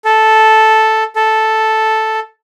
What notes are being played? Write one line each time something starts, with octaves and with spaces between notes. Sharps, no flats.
A4
A4